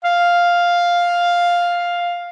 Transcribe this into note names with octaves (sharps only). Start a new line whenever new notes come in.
F5